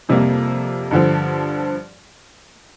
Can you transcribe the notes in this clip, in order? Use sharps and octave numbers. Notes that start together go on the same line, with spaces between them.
F2 C3 G3 A#3
G2 D3 F3